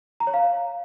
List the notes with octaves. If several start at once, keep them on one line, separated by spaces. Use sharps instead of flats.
A#5
C#5
F5